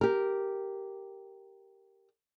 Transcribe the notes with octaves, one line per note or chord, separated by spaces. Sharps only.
G4 A#4